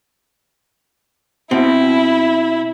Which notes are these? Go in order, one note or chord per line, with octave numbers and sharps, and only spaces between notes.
B2 C4 E4